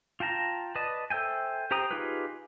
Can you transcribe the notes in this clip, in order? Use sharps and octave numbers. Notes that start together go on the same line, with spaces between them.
F4 G5 A5 A#5
B4 D5 D#5 A5
A4 C5 E5 G5 G#5
G4 C5 G5 A#5 D#6
D#4 F4 G4 G#4 B4